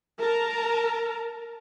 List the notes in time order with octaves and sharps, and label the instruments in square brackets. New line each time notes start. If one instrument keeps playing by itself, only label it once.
[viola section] A#4 A5 A#5